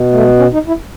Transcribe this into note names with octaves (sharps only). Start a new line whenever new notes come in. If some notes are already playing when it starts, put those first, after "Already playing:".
Already playing: B2
A3
G#3
C#4
D#4
E4